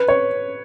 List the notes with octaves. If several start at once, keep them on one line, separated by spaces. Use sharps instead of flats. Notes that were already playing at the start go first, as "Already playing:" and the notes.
Already playing: B4
C#5